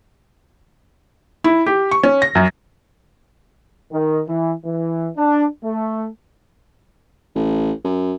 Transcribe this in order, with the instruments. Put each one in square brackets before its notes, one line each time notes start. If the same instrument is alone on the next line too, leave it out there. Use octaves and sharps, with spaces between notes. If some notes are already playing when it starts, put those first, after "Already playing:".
[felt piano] E4
G4
C#6
C#4
A#6
F#2
[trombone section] D#3
E3
E3
D4
A3
[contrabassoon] A1
F#2